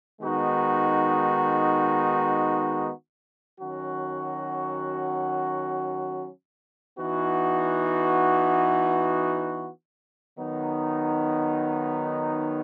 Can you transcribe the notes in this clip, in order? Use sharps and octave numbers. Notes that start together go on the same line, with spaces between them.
D#3 G#3 B3 D#4 F#4
D#3 F#3 C#4 F#4
E3 B3 D#4 F#4
D#3 F#3 B3 D#4